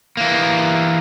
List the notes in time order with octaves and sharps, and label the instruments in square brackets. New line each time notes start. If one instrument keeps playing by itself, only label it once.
[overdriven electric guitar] E3 A#3